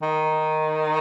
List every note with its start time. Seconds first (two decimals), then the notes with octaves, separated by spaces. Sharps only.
0.02 D#3